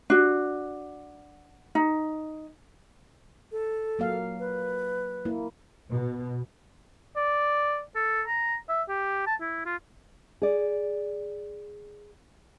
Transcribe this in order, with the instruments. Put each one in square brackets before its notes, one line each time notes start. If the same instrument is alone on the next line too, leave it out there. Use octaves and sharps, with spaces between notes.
[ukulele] D4 F#4
D#4
[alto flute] A4
[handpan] F#3 A#3 F5
[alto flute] B4
[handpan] A#3 E4
[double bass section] B2
[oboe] D5
A4
A#5
E5
G4
A5
E4
F4
[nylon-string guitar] G#4 D5